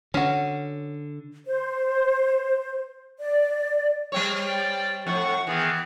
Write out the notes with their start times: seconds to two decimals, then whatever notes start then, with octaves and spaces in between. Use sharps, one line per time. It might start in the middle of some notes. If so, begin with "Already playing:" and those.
0.14 D3 C#4 F#4
1.47 C5
3.19 D5
4.12 G3 C4 C#5
4.47 D5 G5
5.07 F2 A2 F#5 C#6
5.47 D#3 E3 B3 G#4